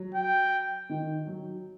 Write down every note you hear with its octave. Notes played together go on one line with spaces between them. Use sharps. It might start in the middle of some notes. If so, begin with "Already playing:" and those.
Already playing: F#3
G5
D#3
F#3